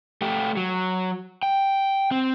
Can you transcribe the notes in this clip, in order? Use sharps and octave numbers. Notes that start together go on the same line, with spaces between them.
A3 G4
F#3
G5
C4